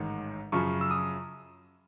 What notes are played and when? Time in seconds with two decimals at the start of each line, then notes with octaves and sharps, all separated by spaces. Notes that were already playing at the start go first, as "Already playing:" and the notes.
Already playing: A1 G#2 D#3
0.52 F#2 C#3 F3 C#6
0.81 E6
0.91 D#6